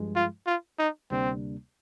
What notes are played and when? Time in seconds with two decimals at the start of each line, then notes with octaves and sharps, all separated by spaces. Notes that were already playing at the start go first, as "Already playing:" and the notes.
Already playing: G2 F3 G#3
0.16 F4
0.46 F4
0.79 D#4
1.11 D2 C3 G3 A#3 C4 D4